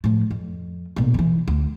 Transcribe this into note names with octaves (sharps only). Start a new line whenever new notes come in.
A2 F3
F2
B1 A#2
D#3 E3
D2